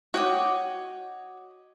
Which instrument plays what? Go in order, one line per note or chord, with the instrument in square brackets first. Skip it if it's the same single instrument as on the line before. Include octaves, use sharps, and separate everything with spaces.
[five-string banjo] F#4 G5 [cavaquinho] C#5 D#5 D6